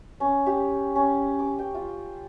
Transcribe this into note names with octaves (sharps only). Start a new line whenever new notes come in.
C#4
G4
C#4
D6
G5
F4